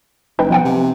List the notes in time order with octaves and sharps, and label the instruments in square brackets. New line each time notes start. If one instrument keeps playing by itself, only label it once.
[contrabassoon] F#1 [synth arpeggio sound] D#4 B4 G5
[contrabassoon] B1 [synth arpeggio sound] F3 F#5 G5
[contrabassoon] C3